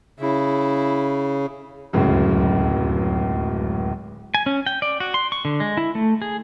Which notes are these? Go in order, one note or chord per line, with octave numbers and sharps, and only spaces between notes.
C#3 E4
D1 C#2 F#2 C#3
G#5
C#4
G5
D5
F#4
C6
C#6
D3
G#3
E4
A3
G#4